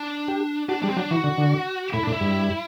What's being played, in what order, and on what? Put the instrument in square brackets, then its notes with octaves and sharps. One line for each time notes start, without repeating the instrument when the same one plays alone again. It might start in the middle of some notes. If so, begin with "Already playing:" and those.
Already playing: [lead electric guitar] D4
[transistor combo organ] G4
[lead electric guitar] D4 [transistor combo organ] F#4
[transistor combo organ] G3 [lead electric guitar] D4
[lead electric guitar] C4
[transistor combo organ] F#3 [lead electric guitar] D4
[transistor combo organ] E3 [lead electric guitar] F#4
[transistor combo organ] D3
D3
[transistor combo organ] A2 [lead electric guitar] E4
[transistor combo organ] A2 [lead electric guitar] D4
[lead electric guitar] E4
[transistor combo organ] G2